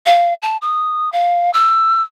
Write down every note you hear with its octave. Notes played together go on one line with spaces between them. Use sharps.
F5
A5
D#6
F5
E6